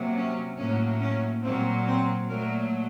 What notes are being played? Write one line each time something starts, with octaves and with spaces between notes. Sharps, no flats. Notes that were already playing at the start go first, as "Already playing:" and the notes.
Already playing: C3 F#3 A#3
C#4
A2 F#3 A#3 C#4
C#4
A#2 F#3 A#3 C4
C4
A#2 F#3 A3 A#4